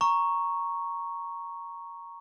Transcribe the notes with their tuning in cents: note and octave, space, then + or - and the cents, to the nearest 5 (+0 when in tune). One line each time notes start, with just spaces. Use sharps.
A#5 +0 C#6 +0